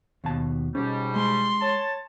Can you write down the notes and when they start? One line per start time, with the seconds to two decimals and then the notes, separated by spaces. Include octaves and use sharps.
0.24 D#2 B2 A5
0.75 G#2 B2 G3 C#4
1.16 G#3 C6
1.61 C#5 A5